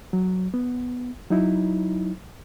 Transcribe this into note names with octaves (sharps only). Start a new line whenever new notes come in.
F#3
B3
F#3 D#4 E4